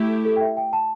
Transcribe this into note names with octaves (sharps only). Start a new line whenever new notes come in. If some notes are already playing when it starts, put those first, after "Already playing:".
Already playing: A3 E4 G4
A4
A4
G5
E5
G5
A5